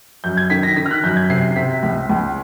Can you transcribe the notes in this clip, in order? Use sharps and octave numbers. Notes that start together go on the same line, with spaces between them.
F#2 G6
G#6
D#3 B6
A#6
D#3 B6
F6
F#6
F#2 G6
G#6
C3 C7
C3 B6
C#2
C#2